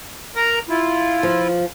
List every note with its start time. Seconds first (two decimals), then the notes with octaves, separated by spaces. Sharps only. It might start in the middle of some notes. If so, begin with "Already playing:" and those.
0.36 A#4 A#5
0.69 E4 F4
1.23 F3